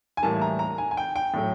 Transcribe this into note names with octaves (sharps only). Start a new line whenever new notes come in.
G#5
A2 E3 G3 A#3 A5
A#5
A#5
G#5
G#5
G5
G5
A2 F#3 A3